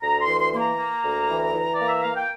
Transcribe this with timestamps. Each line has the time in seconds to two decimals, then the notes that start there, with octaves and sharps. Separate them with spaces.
0.02 D2 A#5
0.20 C6
0.27 E3
0.40 C6
0.52 A#3 C6
0.59 A#5
0.78 A#3
1.03 D2
1.29 E3
1.54 E3
1.75 A#3 D5
1.88 E5
2.02 A#3 F5
2.15 G5